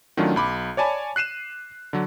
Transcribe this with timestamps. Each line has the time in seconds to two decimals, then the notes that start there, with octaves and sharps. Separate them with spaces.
0.17 D#3 F#3 A3 C#4 D4 F4
0.36 B1 B5 D6
0.77 C#5 D5 G#5 A5 B5
1.16 F#6 C7 D#7 E7
1.93 D3 F#3